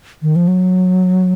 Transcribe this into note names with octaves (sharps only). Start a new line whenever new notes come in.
D#3
F3
F#3